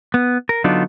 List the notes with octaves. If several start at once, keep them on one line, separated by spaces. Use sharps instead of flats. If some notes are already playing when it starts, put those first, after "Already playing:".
B3
A#4
D3 F#3 B3 D4 D#4 F4